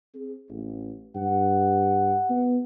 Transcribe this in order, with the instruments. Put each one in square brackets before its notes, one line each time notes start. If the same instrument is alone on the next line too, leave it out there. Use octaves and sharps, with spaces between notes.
[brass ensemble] C4 G#4
A1
[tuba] G2 [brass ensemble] F#5
[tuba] B3